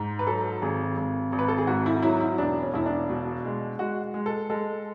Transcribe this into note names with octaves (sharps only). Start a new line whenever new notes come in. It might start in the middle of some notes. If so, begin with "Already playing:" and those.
Already playing: G#2
B4
F#3 A4
G#1 G#4
G#1
G#1
B4
A4
G#4
G#2 F#4
E4
F#3 E4
E4
E1 D4
C#4
E1 E4
D4
B2
G#3
G#3 F#4
G#3
A4
G#3 A4